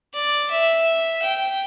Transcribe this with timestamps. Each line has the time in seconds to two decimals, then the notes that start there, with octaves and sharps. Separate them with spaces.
0.14 D5
0.51 E5
1.23 G5